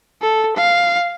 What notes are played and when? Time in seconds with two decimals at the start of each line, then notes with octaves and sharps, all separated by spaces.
0.22 A4
0.56 F5